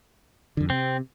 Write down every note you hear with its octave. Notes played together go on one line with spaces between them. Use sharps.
F2 D3
C3 C4